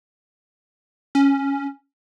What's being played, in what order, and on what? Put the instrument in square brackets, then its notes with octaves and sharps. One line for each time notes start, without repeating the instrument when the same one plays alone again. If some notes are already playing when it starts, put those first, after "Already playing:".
[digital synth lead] C#4